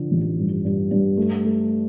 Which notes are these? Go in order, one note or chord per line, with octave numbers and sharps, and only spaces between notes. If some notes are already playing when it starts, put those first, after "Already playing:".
Already playing: D3 F3
A1
G2
G2
G2
A3
A3